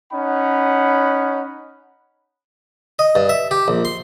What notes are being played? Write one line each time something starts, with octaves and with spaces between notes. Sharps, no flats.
C#4 D#4 F#5 B5
D#5
G2
E5
G4
A#1
C6